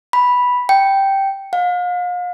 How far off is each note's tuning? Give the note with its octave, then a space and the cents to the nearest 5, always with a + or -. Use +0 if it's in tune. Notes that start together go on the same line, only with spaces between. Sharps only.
B5 -5
G5 -5
F5 +40